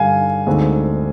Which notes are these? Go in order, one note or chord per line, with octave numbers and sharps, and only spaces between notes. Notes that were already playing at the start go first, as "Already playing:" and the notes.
Already playing: G2 D3 G3 F5 G#5
D2 D3 G#3 C4 D#4